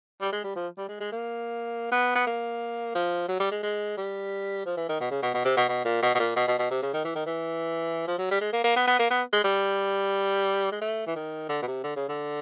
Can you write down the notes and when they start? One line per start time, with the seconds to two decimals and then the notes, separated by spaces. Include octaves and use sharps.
0.21 G3
0.32 G#3
0.44 G3
0.56 F3
0.78 G3
0.89 G#3
1.00 G#3
1.12 A#3
1.92 B3
2.15 B3
2.27 A#3
2.95 F3
3.28 F#3
3.40 G3
3.51 G#3
3.63 G#3
3.97 G3
4.66 F3
4.77 E3
4.89 D#3
5.00 B2
5.11 C#3
5.22 B2
5.34 B2
5.45 C3
5.57 B2
5.68 B2
5.85 A#2
6.02 B2
6.15 B2
6.19 A#2
6.36 B2
6.47 B2
6.59 B2
6.71 C3
6.82 C#3
6.93 D#3
7.05 E3
7.15 D#3
7.26 E3
8.07 F3
8.18 F#3
8.31 G3
8.41 G#3
8.52 A#3
8.64 A#3
8.76 B3
8.87 B3
8.99 A#3
9.10 B3
9.33 G#3
9.44 G3
10.72 G#3
10.81 A3
11.07 E3
11.16 D#3
11.49 D3
11.62 B2
11.67 C3
11.83 D3
11.96 C#3
12.09 D3